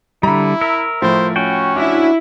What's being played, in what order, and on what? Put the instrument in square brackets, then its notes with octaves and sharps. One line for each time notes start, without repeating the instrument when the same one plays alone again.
[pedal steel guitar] D3 G3 [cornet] E4 [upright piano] A#5 B5
[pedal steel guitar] A#4 E5
[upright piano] A2 F3 A3 [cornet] C5
[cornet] C#4 [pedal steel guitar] F#4 G5
[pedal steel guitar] D4 F#4 [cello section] E4